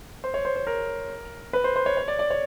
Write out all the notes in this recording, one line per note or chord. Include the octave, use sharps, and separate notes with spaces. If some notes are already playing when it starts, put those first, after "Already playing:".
C5
C#5
C5
C5
A#4
B4
C5
C5
C#5
C#5
D5
D5
C#5